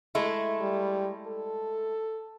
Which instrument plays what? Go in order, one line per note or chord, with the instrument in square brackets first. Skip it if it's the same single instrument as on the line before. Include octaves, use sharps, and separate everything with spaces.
[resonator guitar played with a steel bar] G#3 A3 E4
[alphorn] G3
A4